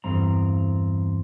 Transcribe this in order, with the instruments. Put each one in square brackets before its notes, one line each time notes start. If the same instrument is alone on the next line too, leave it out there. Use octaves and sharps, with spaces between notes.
[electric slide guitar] E2 G2 C4 A#5